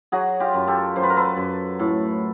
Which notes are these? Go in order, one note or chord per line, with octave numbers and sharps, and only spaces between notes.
F#3 F#4 G#4
F4 G4
F#2
G4 A4
F#2 C5
B4
A#4
A4 B4
F#2
A2